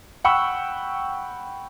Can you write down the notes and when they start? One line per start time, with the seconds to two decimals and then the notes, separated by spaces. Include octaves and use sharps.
0.25 F#5 G5 B5 C#6 E6